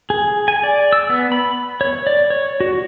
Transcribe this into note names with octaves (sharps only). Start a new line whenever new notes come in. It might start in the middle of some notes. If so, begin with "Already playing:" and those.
G#4
G#5
D5
E6
B3
B5
C#5
D5
C#5
F#4